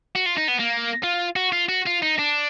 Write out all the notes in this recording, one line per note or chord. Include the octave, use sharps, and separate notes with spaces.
F#4
F4
D#4
B3
A#3
F4
F#4
F4
F#4
F4
D#4
D4